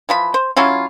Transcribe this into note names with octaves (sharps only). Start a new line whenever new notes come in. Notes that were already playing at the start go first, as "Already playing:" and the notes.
E3 F3 B5
C5
F#3 C#4 E4 F4